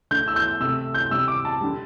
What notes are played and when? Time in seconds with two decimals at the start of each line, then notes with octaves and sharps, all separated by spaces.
0.11 D3 A3 G6
0.28 E6
0.36 G6
0.60 C3 A3 E6
0.94 G6
1.10 C3 G3 E6
1.28 D6
1.45 A5
1.61 D3 G3